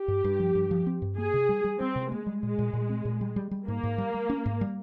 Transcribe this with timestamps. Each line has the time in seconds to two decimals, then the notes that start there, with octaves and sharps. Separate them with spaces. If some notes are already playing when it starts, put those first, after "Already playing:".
Already playing: G4
0.08 G2
0.24 G2
0.40 F3
0.55 G2
0.71 F3
0.87 C4
1.02 G2
1.18 A#3 G#4
1.34 C3
1.49 G3
1.64 G3
1.80 G3 C4
1.96 C3
2.12 G#3 A#3
2.26 G3
2.43 A#2 G#3
2.59 A#2
2.73 A#2
2.89 C4
3.05 A#2
3.21 G3
3.36 G3
3.51 G3
3.68 G#2 A#3
3.83 G#2
3.98 G3
4.14 G3
4.30 C#4
4.46 G#2
4.61 G3